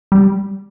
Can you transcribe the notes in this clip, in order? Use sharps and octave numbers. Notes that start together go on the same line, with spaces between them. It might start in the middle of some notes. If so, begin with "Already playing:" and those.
G3